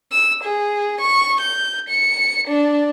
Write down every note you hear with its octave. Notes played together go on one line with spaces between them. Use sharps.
E6
G#4
C#6
G6
C#7
D4